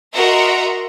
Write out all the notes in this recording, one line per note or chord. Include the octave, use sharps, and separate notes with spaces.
F#4 A#4 D#5 E5 A#5 C6